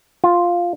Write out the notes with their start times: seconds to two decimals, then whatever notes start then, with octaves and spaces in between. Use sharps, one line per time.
0.24 F4